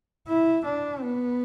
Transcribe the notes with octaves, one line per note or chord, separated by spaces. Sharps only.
E4
D4
B3